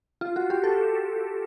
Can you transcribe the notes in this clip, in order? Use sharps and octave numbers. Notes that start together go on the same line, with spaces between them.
F4
F#4
G4
A4